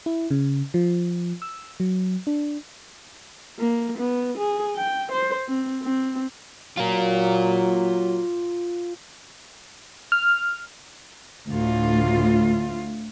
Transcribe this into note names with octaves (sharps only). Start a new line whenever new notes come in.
E4
C#3
F3
E6
F#3
D4
A#3
B3
G#4
G5
C5
C4
C4
F#3 F4 A#4
F6
D2 A2 F4